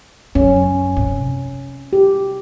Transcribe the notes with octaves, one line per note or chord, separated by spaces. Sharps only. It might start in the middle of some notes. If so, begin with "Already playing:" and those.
F#2 C#4
C3
G4